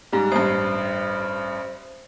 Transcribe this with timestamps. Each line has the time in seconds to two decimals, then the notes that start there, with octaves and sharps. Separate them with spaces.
0.13 G#2 G3
0.32 A1 G2 C5